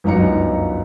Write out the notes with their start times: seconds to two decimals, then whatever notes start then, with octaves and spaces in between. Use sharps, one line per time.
0.04 G1 C#2 F#2 D#4 A#5 C#7